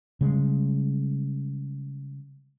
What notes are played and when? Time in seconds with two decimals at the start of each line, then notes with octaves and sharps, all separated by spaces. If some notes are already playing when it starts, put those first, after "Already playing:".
0.21 C#3 G3 G#3